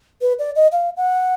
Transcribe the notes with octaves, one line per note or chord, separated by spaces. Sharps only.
B4
D5
D#5
F5
F#5